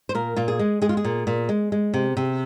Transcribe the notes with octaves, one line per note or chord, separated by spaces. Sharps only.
C5
A#2 A#4
A#2 F4
G#4
G#3
G#3 G#4
F4
G#4
A#2
A#2
G#3
G#3
C3
C3